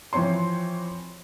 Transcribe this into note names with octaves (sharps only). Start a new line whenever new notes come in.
E3 F3 C4 C#5 C6